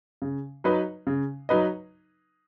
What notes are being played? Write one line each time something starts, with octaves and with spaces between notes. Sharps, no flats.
C#3
F#3 D#4 B4 D#5
C#3
F#3 D#4 B4 D#5